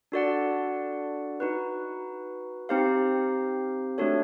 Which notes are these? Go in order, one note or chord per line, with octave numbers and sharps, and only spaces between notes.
D4 F#4 A4 D5 F#5
D#4 F#4 B4
C4 D#4 G4 C5 F5
A3 D4 F#4 A4 C#5